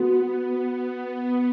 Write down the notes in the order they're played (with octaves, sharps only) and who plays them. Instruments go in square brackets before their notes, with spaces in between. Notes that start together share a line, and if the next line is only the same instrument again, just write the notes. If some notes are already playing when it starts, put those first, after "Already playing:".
Already playing: [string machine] B3 [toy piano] F#4
[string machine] B3
B3